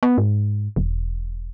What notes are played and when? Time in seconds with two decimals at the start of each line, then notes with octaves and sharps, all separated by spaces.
0.03 B3
0.18 G#2
0.76 E1